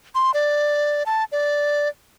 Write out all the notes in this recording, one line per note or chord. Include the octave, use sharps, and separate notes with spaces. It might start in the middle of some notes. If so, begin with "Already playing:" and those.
C6
D5
A5
D5